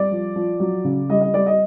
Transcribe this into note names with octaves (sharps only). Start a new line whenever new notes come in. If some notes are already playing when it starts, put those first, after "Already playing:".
Already playing: G3 D5
F3
F3
F#3
C#3
G3 D#5
D#5
G3 D5
D#5